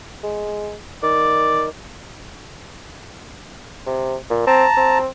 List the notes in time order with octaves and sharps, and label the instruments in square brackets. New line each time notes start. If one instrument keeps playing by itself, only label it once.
[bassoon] G#3
[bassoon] D#3 [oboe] D5
[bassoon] C3
A#2
[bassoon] C4 [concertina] A5 A#5
[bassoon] C4